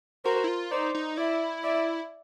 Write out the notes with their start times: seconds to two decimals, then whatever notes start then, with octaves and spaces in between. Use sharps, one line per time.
0.25 F#4 A#4 C5
0.44 E4
0.48 F4
0.71 D#4 C5 D5
0.95 D#4
1.17 E4 D5 E5
1.63 D5 E5